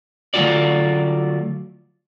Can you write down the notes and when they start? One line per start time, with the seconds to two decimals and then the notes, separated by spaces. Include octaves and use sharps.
0.34 D3 F#3 A3 F4 F#4 D5